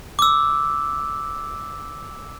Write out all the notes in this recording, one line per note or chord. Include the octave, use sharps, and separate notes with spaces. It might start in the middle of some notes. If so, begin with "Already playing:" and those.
D6 E6